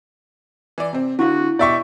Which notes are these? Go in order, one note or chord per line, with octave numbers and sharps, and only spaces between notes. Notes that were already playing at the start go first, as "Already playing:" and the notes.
E3 D5
C3 C4
D3 E4 F#4 F5
B2 G4 D5 E5 C#6